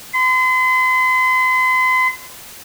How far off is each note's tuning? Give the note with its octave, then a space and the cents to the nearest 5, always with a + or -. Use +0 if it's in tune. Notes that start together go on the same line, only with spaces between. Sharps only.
C6 -40